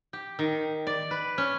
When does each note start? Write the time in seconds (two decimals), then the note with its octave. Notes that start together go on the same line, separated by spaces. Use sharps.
0.13 G4
0.39 D#3
0.87 D5
1.11 B4
1.38 C#4